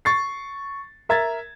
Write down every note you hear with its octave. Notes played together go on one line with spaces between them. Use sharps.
C#6 A6 C7
A#4 E5 A#5 G#6 A6